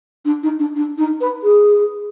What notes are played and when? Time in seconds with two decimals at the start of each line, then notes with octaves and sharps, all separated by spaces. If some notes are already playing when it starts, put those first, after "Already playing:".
0.25 D4
0.43 D#4
0.59 D4
0.76 D4
0.98 D#4
1.21 B4
1.43 G#4